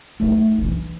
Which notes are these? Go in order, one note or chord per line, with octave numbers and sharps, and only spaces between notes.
A3 D#4
E3 D4